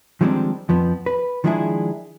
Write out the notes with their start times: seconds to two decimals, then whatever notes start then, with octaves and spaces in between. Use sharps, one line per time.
0.21 D#3 F3 G3 G#3 C4 D4
0.69 F2 F3 B3
1.06 B4
1.44 D#3 F3 G#3 D4 E4 G#4